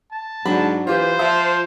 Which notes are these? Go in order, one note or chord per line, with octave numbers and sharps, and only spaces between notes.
A5
G#2 F#3 D4 B5
E3 F4 G4 C5
F3 E5